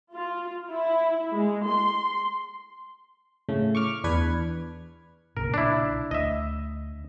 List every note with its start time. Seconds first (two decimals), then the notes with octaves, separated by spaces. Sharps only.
0.14 F4
0.70 E4
1.34 G#3
1.67 C6
3.49 A2 C#3 A3
3.75 C#6 D6 F6
4.04 E2 D4 B4 G#6
5.37 B1 A#2 C#3 A#4
5.54 D4 E4
6.11 D2 D#5 E5